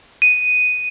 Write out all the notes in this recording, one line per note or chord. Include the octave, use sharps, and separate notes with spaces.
D#7